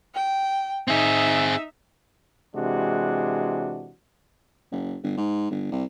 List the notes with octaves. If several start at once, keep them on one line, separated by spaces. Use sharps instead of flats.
G5
C4 D#4 G#4 E5
C3 E3 G#3 D4 F#4
F#1
G1
G#2
G1
C2